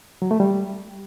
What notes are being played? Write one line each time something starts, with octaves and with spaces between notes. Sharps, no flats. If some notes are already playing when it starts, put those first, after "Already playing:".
F#3
A3
G3